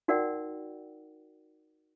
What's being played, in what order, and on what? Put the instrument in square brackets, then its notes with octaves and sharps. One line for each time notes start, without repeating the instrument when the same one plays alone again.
[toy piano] D#4 F#4 A#4 D5 F#5 G5